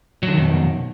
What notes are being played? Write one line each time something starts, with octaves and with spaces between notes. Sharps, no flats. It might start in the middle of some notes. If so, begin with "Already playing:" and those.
F2 B2 D3 D#3 F#3